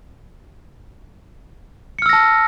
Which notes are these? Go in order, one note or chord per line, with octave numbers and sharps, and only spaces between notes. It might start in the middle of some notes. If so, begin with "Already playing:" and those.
A5 E6 F6 A#6 C#7